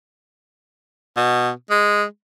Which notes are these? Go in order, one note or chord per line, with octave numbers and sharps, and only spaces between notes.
B2
G#3